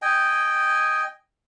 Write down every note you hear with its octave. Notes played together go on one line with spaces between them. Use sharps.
D#5 G5 G#5